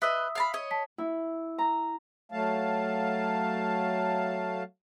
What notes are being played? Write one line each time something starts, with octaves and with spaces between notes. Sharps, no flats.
B4 D#5 E5 D#6 E6
F5 A5 B5
C#5 D#5
A5 B6
E4
A#5
F#3 A3 F5 A5